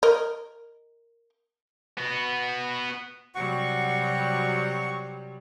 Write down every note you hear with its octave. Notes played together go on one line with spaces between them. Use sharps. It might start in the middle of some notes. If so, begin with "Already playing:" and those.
A#4 D#5
B3 F#4
C3 F#3 G3 F#4 F#5 C#6